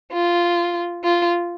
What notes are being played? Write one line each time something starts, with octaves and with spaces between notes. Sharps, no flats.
F4
F4